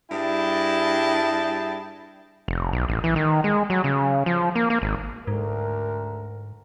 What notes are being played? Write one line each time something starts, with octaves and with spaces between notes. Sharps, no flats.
G2 G3 E4 G#4 G5 A5
F1
B1
A1
E3
D#3
G#3
F#3
C#3
F3
A#3
A#3
G#1
D2 G#2 A#4